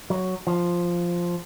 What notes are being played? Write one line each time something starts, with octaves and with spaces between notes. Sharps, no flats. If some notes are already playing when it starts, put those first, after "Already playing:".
F#3
F3